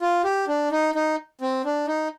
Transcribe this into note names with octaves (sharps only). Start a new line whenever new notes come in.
F4
G4
D4
D#4
D#4
C4
D4
D#4